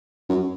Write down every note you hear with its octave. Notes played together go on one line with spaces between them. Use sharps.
F#2